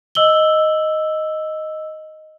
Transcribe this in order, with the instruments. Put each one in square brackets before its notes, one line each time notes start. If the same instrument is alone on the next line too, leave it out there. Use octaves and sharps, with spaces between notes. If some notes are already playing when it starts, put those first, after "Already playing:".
[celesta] D#5 E6 F#7 G7